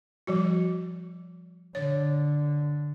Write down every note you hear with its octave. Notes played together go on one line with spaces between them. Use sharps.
F3 G3 F#4
D3 C#5